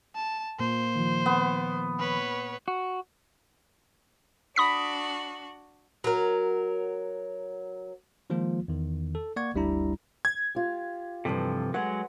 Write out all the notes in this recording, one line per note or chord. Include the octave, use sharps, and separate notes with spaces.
A5
A#2 A#3 C5
D#3 F3
B3
B4 C#5
F#4
D4 F#4 B5 D#6 B6
F#3 A#4
D#3 F3 G#3 A#3 F4
E2 D#3
A4
A#3 D5 F#5 C#6 G#6
G1 D2 G3 D4 E4 A#5
G#6
F4 G4
G2 C3 E3 F3 A4
F#3 G#3 B4 F#5